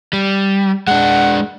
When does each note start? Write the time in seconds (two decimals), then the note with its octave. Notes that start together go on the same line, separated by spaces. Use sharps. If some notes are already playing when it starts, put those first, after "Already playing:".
0.13 G3
0.88 G#3 D4 F#5